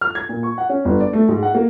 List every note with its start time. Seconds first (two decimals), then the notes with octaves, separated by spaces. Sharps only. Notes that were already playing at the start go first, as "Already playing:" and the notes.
0.01 F6
0.15 G#6
0.29 A#2
0.43 C#6
0.58 F#5
0.69 C#4
0.85 G1
1.00 D5
1.13 A3
1.29 G#2
1.43 F#5
1.55 A#3